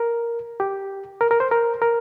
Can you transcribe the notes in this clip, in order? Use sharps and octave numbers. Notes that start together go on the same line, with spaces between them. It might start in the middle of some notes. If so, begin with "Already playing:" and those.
Already playing: A#4
G4
A#4
A#4
C5
A#4
A#4